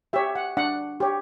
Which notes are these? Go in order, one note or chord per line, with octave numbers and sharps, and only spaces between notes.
G4 C#5 E5
F#5
D4 F#5
G4 C#5